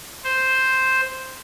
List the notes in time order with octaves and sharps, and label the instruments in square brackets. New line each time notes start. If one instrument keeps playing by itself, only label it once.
[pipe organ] C5